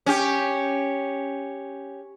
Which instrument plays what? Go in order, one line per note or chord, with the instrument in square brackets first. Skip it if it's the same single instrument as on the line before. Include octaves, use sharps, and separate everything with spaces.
[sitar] C#4 G4